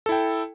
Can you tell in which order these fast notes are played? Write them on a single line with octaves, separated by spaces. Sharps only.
A4 E4 G5